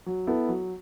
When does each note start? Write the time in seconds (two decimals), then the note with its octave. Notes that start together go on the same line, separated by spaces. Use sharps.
0.06 F#3
0.27 B3 E4 A4
0.49 F#3